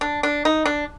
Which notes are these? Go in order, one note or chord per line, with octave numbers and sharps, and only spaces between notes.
D4
D4
D#4
D4